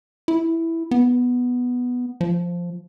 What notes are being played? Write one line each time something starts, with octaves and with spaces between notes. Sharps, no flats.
E4
B3
F3